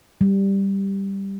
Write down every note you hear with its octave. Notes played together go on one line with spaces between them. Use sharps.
G3